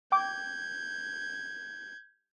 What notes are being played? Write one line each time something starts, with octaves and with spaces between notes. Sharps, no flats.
G5 D6 G6 G#6